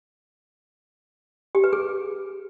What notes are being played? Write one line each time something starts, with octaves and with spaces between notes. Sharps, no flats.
G4
B4
G#4